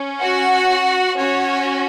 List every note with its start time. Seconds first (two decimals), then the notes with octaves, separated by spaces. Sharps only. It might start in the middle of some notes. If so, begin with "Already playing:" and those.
Already playing: C#4
0.20 F#4 F#5
1.16 C#4 F#4 C#5